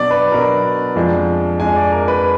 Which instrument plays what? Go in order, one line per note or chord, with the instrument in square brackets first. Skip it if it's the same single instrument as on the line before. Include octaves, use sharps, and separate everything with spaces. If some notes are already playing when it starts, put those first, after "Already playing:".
Already playing: [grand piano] B2 F#3 D4 D5
B4
B2 F#3 D4 A#4
F2 F3 G#3 D4
F2 F3 G#3 D4 G#5
D5
A#4
B4